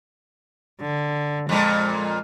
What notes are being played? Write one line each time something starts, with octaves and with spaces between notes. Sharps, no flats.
D3
F2 A#2 G#3